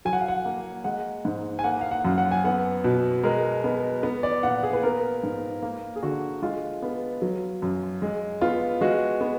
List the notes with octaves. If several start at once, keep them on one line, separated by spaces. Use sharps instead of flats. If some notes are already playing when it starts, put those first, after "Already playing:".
F#3 G#5
F#5
F5
F#5
A#3
G#3 F#5
G#2
G#5
A#3 F#5
F5
F#5
F#2
F#5
G#5
B3 F#5
B2
G#3 A#4
B3
B3
D5
A#2 F#5
G#4
B4
B3 A#4
G#2
A#3
G#4
D3 F#4
G#3 F4
B3
F#3
F#2
G#3
B3 F4
G#3 F#4
B3